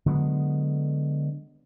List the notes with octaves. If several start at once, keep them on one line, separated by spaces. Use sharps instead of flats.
D3 F#3 G#3 B3